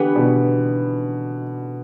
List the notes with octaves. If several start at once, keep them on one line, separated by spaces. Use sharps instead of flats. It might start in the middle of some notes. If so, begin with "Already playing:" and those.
Already playing: D3 E3 B3 G4 B4
B2